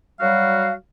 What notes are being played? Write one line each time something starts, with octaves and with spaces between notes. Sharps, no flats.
F#3 G3 F#4 F5